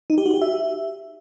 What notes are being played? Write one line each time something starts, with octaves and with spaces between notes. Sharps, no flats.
D#4
G4
F#4
G4
E5